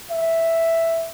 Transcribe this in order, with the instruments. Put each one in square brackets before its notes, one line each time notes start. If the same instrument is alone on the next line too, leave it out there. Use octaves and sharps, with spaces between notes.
[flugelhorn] E5